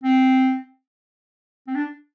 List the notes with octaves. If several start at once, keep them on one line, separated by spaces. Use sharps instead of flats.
C4
C4
D4